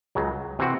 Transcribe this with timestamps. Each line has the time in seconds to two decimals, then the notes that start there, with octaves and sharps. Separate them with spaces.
0.15 C#2 C#3 F#3
0.59 C3 E3 C4 F#4